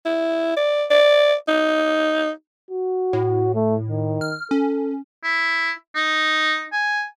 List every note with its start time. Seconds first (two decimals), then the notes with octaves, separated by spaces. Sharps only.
0.06 E4
0.56 D5
0.91 D5
1.48 D#4
2.71 F#4
3.13 A2
3.55 A3
3.90 D#3
4.21 F6
4.51 C#4 A4
5.24 E4
5.95 D#4
6.72 G#5